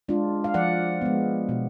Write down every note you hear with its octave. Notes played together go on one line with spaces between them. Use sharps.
G#3 D4 F4
F5
F3 D5 F#5
G#3 B3
B2